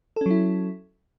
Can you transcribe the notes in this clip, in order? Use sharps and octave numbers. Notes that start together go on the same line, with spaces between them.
F#3 C#4 E4 A4